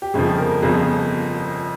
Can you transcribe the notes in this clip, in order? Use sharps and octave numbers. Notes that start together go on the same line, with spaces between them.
G4
G1 F2 C#3 F3 G#4
A#4
G1 F2 C#3 F3 G#4